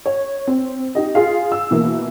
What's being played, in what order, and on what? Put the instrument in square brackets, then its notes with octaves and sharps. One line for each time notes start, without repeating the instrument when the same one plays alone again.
[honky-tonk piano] C#5
C4
D#4 G4 D#5
F4 G#4 F5
E6
B2 E3 A#3